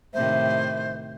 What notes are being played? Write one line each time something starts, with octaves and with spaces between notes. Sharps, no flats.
A2 C3 D#3 C5 E5